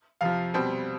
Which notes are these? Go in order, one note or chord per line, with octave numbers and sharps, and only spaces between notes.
F2 C3 F3 F5
B2 G3 C4